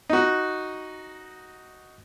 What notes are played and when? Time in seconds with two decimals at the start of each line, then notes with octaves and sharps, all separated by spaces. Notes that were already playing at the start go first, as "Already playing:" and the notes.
0.09 D#4 F#4